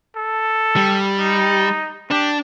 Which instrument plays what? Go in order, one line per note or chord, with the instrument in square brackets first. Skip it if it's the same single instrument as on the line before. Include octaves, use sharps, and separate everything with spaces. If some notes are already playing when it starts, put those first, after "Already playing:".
[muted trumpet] A4
[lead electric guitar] G3
[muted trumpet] D#4
[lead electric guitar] D4 [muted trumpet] G4